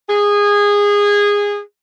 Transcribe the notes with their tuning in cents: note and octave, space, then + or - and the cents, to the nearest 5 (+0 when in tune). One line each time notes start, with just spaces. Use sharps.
G#4 -20